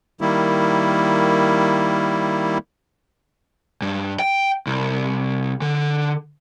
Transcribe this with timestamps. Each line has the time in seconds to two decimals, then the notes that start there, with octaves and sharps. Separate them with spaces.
0.21 D#3 G3 A#3 E4
3.82 G2
4.19 G5
4.67 C2
5.62 D3